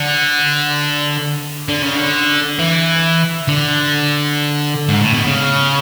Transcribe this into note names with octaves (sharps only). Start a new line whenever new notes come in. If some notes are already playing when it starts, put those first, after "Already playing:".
Already playing: D3
D3
C#3
D3
E3
D3
G#2
A2
B2
C#3